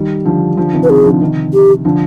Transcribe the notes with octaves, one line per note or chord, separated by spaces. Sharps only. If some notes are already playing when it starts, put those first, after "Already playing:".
Already playing: D#3 G3
D3 F3
D3 F3
C3 D#3
B4
C3 D#3 G#4
D3 F3
C3 D#3
G4
D3 F3